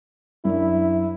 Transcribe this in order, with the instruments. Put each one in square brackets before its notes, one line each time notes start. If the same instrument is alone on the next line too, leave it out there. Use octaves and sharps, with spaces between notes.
[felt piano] F#2 D4 [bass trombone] E4